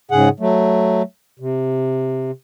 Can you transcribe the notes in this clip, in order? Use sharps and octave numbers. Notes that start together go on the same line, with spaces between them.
G#2 C#3 G#4 F#5
F#3 A3
C3